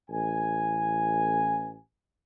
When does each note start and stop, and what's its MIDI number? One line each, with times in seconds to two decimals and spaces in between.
0.10 1.77 33
0.10 1.77 80